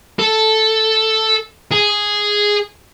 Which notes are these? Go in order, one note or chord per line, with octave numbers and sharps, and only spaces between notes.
A4
G#4